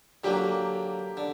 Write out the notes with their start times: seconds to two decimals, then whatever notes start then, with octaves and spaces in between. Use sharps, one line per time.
0.24 D3 F#3 A#3 G4
1.17 D3